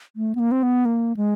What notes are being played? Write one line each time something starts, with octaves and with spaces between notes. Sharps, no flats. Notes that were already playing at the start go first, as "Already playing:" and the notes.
A3
B3
A#3
C4
B3
A#3
G#3